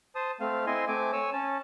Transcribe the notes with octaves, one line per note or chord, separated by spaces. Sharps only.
C5 A5 D#6
A3 C4 F5
C4 E4 D#5 G#5 C6
A3 C4 G#5 D6
C#5 G#5 E6
C#4 A5